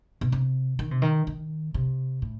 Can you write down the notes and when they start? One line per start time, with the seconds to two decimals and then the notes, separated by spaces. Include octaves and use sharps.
0.21 B2
0.32 C3
0.79 D#3
0.91 C3
1.02 D#3
1.27 D#3
1.74 C3
2.22 A2